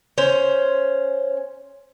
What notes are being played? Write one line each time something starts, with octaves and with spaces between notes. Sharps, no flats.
C#4 C5